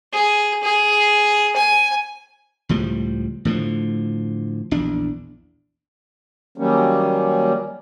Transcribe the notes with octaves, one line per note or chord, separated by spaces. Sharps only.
G#4
G#4
G#5
C#2 A2 F3 G3
A2 D3 F3
A#1 E2 D4
D#3 F#3 G3 A#3 C#4